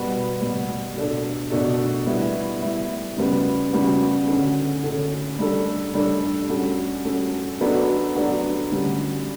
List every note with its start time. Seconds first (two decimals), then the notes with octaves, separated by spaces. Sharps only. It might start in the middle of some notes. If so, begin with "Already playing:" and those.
Already playing: B2 G3 B3 F#4
0.41 B2 G3 B3 F#4
0.96 B2 A3 D4 A4
1.51 B2 A3 D4 A4
2.07 G3 B3 E4
2.62 G3 B3 E4
3.18 C#3 G3 B3 F#4
3.73 C#3 G3 B3 F#4
4.28 D3 A3 C#4 F#4 A4
4.83 D3 A3 C#4 F#4 A4
5.39 G3 D4 A4
5.94 G3 D4 A4
6.49 G3 C#4 F#4 A4
7.05 G3 C#4 F#4 A4
7.60 F#3 B3 D4 F#4 A4
8.15 F#3 B3 D4 F#4 A4
8.71 D3 G3 C#4 G4